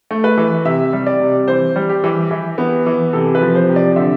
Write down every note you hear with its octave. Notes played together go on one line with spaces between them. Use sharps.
A3
B4
E3
C3 E5
G3
D5
C3
E3 C5
G3
G4
E3
E3
B3
E3
C3 A4
B4
F3
C5
C3
D5
D3 E5